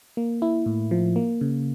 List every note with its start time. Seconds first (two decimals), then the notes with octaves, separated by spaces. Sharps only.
0.17 A#3
0.42 E4
0.66 A2
0.91 F3
1.16 A#3
1.41 C#3